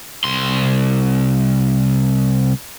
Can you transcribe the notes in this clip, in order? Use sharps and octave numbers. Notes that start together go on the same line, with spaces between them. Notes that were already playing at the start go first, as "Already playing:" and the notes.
C2 C6